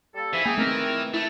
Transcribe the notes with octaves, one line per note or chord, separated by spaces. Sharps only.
G3 A#3 A4
G#2 E3 C#4 E5 B5
A#3 G#4 G5
D#3 A3 C4 A#4
A3 E4